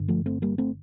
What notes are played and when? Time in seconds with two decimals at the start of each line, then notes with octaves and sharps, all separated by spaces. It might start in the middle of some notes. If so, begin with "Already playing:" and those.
Already playing: G1 G2 D3
0.08 F3 A3
0.26 A3 C4
0.42 G3 A#3
0.58 A3 C4